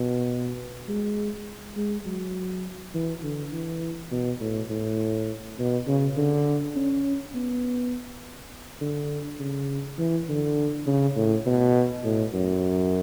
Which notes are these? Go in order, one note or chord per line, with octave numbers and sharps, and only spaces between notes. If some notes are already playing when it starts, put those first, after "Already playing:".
Already playing: B2
G#3
G#3
F#3
E3
D3
E3
B2
A2
A2
B2
C#3
D3
C#4
B3
D3
C#3
E3
D3
C#3
A2
B2
A2
F#2